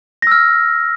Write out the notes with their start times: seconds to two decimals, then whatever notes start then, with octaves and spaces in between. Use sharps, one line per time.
0.22 A#6
0.27 E6
0.32 F6